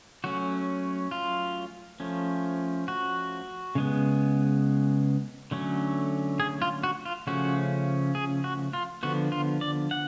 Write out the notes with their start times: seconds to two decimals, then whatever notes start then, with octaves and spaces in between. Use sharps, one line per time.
0.24 F#3 A3 C#4 F#4
1.11 F4
2.00 F3 A3 C#4
2.88 F#4
3.75 C#3 G#3 B3
5.51 D3 F#3 A3 C#4
6.40 G#4
6.62 F4
6.83 F#4
7.05 F4
7.27 C#3 F3 A3 C#4 F#4
8.15 G#4
8.44 F#4
8.73 F4
9.03 D3 F3 B3 F#4
9.32 F4
9.61 D5
9.91 F#5